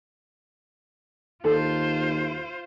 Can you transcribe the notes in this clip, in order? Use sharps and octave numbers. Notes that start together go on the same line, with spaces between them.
D#2 F4 A4 C5